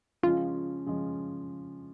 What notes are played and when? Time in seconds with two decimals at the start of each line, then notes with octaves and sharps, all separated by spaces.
0.23 C#3 F3 G#3 C#4 F4
0.86 C#3 F3 G#3 C#4